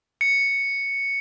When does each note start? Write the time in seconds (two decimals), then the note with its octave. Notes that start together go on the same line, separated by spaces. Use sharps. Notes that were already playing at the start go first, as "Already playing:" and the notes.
0.21 C#7